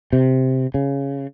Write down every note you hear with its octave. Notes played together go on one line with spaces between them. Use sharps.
C3
C#3